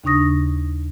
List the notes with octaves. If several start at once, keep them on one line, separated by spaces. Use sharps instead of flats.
D#2 C#3 D4 C#6 D#6 A#6